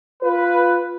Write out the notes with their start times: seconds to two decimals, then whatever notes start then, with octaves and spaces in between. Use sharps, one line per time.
0.23 F4 B4